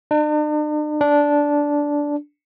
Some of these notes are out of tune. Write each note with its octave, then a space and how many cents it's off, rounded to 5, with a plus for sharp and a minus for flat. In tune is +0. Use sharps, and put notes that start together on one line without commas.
D4 +45
D4 -10